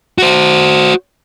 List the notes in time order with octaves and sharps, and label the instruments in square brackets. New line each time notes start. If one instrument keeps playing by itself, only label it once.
[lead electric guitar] F#4 C5